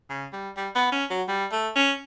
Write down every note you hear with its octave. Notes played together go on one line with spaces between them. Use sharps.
C#3
G3
G3
B3
C#4
F#3
G3
A3
C#4